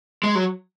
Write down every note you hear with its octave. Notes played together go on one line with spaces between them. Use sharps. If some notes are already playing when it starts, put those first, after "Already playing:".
G#3
F#3